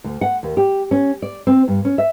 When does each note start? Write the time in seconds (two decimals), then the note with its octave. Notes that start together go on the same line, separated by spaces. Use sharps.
0.04 D2
0.21 F#5
0.43 D#2
0.57 G4
0.91 C#4
1.22 D5
1.47 C4
1.68 G2
1.85 C#4
1.98 E5